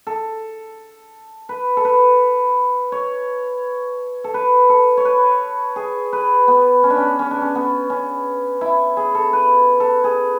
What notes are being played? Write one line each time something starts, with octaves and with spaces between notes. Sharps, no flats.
A4
B4
A4
B4
C#5
A4
B4
A4
C#5
B4
G#4
B4
B3
C#4
D4
C#4
C#4
D4
C#4
B3
C#4
E4
G#4
A4
B4
A4
G#4